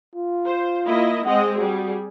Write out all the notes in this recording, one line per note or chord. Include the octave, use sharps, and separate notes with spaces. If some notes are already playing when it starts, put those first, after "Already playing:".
F4
C5
A#3 E4 D#5
G#3 C4 D#5 F#5
G3 F#4 G#4